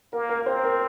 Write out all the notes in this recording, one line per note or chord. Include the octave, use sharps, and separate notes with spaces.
A#3 A#4
A#4
C4 C5
A#4